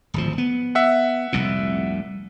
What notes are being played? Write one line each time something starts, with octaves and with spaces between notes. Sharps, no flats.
D1 G#1 F3
B3
E5 F#5
F1 C2 A#2